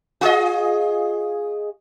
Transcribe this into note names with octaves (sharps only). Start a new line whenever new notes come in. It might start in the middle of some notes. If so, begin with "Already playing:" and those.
F4 G#4 D#5